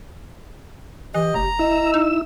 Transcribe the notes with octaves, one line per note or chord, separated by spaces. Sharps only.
E3 G4 D#5
F1 A#5
E4 D#5 E6
D#4